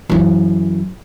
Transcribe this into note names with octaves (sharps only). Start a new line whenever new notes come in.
F#2 E3